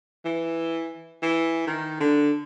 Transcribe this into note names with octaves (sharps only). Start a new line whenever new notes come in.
E3
E3
D#3
D3